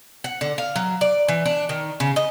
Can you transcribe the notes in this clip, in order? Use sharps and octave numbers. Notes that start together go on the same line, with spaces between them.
F#5
D3
F5
F#3
D5
E3
D4
D#3
C#3
D#5